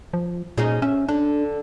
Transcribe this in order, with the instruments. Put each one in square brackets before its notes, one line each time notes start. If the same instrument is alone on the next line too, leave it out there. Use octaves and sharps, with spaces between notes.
[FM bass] F3
[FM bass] A#2 [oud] C#4 D#4 G#4
[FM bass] C#4 [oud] E5
[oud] D3 [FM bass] D4